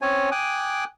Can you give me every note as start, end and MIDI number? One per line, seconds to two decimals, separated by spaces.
0.02 0.30 60
0.02 0.30 61
0.02 0.30 73
0.02 0.30 80
0.31 0.84 79
0.31 0.84 80
0.31 0.84 86
0.31 0.84 87
0.31 0.84 90